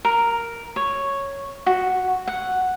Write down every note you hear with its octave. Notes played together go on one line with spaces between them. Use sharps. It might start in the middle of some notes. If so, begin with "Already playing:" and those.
A#4
C#5
F#4
F#5